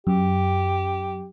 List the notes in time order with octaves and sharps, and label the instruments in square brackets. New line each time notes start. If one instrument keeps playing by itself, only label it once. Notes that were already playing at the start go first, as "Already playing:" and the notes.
[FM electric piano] F#2 [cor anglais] G4